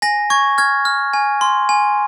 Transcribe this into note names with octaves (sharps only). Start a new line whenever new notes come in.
G#5 A#6
C#6 G#6
F6 G#6
F6
G#5
C6
G#5